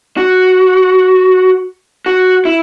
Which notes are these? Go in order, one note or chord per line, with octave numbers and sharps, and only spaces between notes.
F#4
F#4
E4